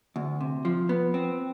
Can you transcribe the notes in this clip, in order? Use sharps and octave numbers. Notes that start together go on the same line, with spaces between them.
D2
C3
F3
B3
C4